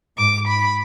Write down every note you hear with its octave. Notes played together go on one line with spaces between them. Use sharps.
G#2 D6
B5